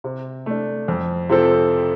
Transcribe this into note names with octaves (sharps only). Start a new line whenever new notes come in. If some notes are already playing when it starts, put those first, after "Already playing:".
C3
A3 D4
F2
C3 F3 C4 A4